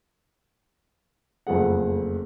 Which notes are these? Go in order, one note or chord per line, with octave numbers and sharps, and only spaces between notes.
F#1 F2 A3 G#4 F#5